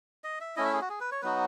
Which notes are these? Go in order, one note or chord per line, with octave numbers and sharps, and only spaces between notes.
D#5
E5
A3 C#4 E4 D#5
E5
G#4
F#4
G#4
B4
C#5
F#3 B3 D#4 F#4 B4